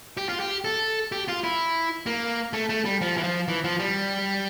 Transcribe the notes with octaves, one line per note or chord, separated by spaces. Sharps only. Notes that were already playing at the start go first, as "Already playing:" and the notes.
G4
F4
G4
A4
G4
F4
E4
A#3
A3
A3
G3
F3
E3
F3
E3
F3
G3